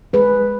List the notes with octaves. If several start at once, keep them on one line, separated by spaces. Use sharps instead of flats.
G#3 G#4 B4